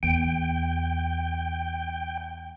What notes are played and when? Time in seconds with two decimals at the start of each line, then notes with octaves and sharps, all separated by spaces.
0.03 E2 G5